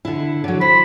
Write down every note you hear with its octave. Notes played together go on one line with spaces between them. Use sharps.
D3 E4
D3 F#3
C5 B5